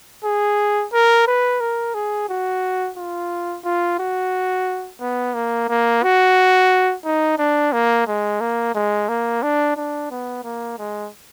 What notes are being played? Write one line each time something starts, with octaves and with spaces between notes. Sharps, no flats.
G#4
A#4
B4
A#4
G#4
F#4
F4
F4
F#4
B3
A#3
A#3
F#4
D#4
D4
A#3
G#3
A#3
G#3
A#3
D4
D4
B3
A#3
G#3